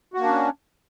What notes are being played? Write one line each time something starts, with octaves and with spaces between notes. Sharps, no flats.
A#3 C#4 D4 F#4